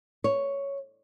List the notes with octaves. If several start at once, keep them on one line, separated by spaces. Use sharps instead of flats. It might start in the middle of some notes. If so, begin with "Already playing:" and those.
C#5